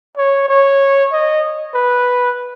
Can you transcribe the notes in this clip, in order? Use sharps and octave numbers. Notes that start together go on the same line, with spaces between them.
C#5
C#5
D#5
B4